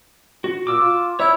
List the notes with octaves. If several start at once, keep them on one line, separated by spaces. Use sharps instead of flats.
F#4
A#2 D6 E6
F4
E4 C#5